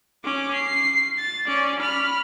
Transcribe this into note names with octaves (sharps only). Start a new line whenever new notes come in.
C#4 D6
C7
A6
C#4 D5
B5 F6